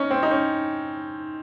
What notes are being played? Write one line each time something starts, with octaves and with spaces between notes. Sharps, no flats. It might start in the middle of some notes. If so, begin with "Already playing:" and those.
Already playing: C#4 D#4
C4
D#4
C#4